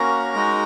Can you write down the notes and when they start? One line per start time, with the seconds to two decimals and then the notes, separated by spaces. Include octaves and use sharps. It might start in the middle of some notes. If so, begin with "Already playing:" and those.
Already playing: A#3 C#4 F#4 A#4 A#5
0.35 G#3 D#4 F#4